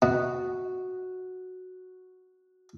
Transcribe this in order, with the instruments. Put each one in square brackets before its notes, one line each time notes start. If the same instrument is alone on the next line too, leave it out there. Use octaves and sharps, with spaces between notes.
[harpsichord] B2 [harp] F#4